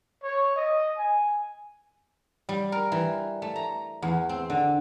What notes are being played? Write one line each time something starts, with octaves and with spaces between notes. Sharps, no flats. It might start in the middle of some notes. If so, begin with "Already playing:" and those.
C#5
D#5
G#5
G3
A#4
E3
A3
A#5
E2
C4
D3